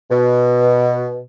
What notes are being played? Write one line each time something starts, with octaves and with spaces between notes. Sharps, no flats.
B2